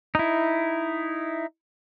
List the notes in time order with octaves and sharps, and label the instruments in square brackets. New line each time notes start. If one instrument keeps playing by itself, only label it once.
[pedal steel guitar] D#4 E4